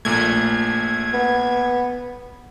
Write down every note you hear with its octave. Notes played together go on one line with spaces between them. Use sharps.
A#1 A#2 A3 G#6
B3